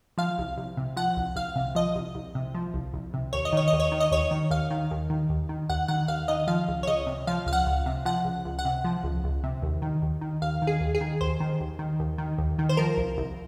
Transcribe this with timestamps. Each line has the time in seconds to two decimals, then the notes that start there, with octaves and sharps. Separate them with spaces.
0.18 F3 F5
0.38 C2
0.57 C2
0.77 C3
0.96 F3 F#5
1.17 C2
1.36 C2 F5
1.56 C3
1.75 F3 D#5
1.95 C2
2.15 C2
2.35 C3
2.55 F3
2.74 C2
2.94 C2
3.14 C3
3.33 D#2 C#5
3.45 D#5
3.53 D#3 C#5
3.68 D#5
3.73 D#2
3.80 C#5
3.92 D#3
4.00 D#5
4.11 D#2 C#5
4.31 D#3
4.51 D#2 F5
4.71 D#3
4.91 D#2
5.10 D#3
5.29 D#2
5.49 D#3
5.70 D#2 F#5
5.88 D#3 F#5
6.08 D#2 F5
6.28 D#3 D#5
6.47 F3 F5
6.68 C#2
6.83 C#5
6.87 C#2 D#5
7.07 C3
7.27 F3 F5
7.46 C#2 F5
7.53 F#5
7.67 C#2
7.86 C3
8.05 F3 F#5
8.25 C#2
8.45 C#2
8.59 F#5
8.65 C3
8.85 F3
9.04 C#2
9.24 C#2
9.44 C3
9.62 D#2
9.82 D#3
10.02 D#2
10.21 D#3
10.42 D#2 F5
10.62 D#3
10.67 G#4
10.81 D#2
10.95 G#4
11.01 D#3
11.21 D#2 C5
11.40 D#3
11.60 D#2
11.79 D#3
12.00 D#2
12.18 D#3
12.38 D#2
12.59 D#3
12.69 C5
12.77 F3 A#4
12.97 C2
13.18 C2